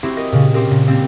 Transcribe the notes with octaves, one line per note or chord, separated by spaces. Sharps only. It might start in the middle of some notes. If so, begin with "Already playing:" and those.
C4 E4 F#4 G4
A#4 D#5
A#2 C#3
C4 G4 A#4
A#2
G3 A#3 C4